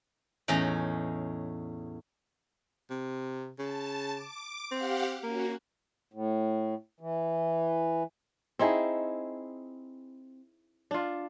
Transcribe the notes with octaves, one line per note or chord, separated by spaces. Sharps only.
E2 A2 C#4 D#4 A#5
C3
C#3 A5
D6
C4 G4 F5 F#5
A#3 C#4 F#4
A2
E3
C4 D#4 E4 G#4
D4 F4